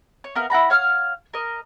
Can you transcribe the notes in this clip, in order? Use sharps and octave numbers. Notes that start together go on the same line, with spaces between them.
C#5
B3 A#4 F5
E4 F#5 A#5 B5
C#5 F5 F#5 F6
A#4 D#5